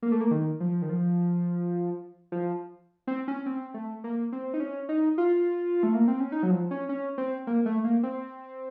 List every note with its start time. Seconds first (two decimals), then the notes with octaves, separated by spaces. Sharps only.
0.02 A#3
0.12 A3
0.21 A#3
0.31 D#3
0.60 F3
0.82 D#3
0.89 F3
2.32 F3
3.07 C4
3.28 C#4
3.46 C4
3.74 A3
4.04 A#3
4.32 C4
4.54 D#4
4.60 C#4
4.89 D#4
5.18 F4
5.83 A3
5.94 A#3
6.08 C4
6.20 C#4
6.32 D#4
6.43 F#3
6.51 F3
6.71 C#4
6.89 C#4
7.18 C4
7.47 A#3
7.66 A3
7.84 A#3
8.03 C4